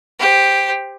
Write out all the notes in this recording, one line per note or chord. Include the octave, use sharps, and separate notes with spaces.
G4 C5